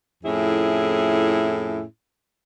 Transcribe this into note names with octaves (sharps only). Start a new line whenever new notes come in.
F2 A2 C#4 E4 G#4